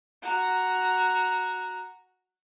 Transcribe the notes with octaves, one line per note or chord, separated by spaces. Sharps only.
F#4 A#5